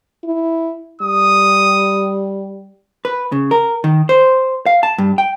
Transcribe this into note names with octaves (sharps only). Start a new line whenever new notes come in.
E4
G3 D#6
B4
C#3
A#4
D#3
C5
F5
A5
G2
G5